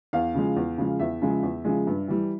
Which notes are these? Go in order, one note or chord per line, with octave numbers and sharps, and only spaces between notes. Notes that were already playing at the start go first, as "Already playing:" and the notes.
E2 F5
C#3 F3 G#3
E2
C#3 F3 G#3
E2 E5
C#3 F3 G#3
E2
C#3 F3 G#3
G2
E3 G3